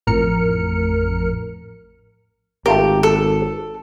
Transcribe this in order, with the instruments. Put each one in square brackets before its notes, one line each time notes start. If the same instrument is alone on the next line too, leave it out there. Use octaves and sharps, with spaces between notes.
[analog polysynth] A1 F2 A2 A#4 F6 C#7
[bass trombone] G#1 [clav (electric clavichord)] A3 F4 A#4 [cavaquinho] G4
[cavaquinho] A4